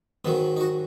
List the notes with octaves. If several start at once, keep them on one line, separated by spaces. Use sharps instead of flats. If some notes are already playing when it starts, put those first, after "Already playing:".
G#2 D#3 F#3 B3
D#4
F#4